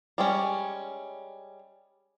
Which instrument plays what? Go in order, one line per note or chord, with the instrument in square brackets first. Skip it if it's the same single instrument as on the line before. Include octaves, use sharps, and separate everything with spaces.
[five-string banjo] G3 G#3 C#4